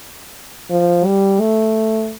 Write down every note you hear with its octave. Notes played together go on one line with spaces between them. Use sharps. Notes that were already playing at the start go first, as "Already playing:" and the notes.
F3
G3
A3